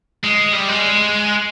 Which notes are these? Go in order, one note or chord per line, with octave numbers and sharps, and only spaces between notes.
G#3
G3
G#3